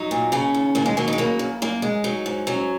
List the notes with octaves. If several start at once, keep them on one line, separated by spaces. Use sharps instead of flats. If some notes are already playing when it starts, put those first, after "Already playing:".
Already playing: F#3 D#4
A#2
C#3 C#4
D#2
D#2 A#3
G#3
F#3 A#3
D#4
G#3
C#3 A#3
F#2
F#2 A#3
G#3
F#3 D#4
G#2
F#3 C#4